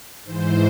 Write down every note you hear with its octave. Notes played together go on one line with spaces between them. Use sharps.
G#2 E3 C5